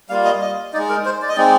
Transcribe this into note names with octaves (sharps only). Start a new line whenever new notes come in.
G3 A#3 F4 F5
D#5
D#5
G#3 D#4 D5
A#4
C5
D5
D#5
G#3 C4 D#4 D5